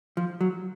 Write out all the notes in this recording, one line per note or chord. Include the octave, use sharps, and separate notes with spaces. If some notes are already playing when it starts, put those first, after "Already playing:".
F3
F#3